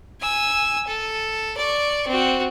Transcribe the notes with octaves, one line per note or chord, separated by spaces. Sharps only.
G#5 E6
A4
D5 C#6
C4 F#4